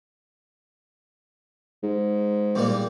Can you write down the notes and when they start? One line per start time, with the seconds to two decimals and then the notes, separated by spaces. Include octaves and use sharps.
1.83 G#2
2.55 E2 A#2 G3